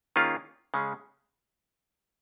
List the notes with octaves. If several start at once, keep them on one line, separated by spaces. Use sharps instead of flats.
D#3 A#3 C#4 F4 G#4
C#3 G#3 C#4 G#4